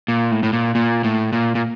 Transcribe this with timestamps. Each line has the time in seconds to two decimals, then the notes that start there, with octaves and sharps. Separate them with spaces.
0.08 A#2
0.31 A2
0.43 A2
0.53 A#2
0.75 A#2
1.04 A2
1.33 A#2
1.55 A#2